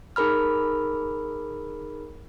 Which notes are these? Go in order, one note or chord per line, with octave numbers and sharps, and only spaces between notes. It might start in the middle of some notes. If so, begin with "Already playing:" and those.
D#4 G#4 A#4 B5 F6